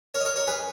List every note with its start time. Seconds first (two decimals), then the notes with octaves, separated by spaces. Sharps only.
0.14 A#4 C#5
0.20 D#5
0.25 A#4 C#5
0.36 A#4 C#5
0.47 G#4 B4